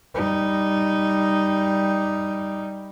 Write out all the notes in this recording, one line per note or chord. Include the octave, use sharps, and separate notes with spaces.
G3 D#4